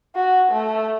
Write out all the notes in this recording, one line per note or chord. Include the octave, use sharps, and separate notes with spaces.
F#4
A3